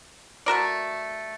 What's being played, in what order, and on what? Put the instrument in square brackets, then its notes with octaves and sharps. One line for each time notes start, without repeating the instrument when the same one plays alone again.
[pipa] A3 F#4 A#4 D5